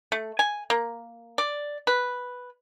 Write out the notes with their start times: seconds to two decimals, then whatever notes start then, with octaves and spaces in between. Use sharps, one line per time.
0.12 A3
0.39 G#5
0.70 A#3
1.38 D5
1.87 B4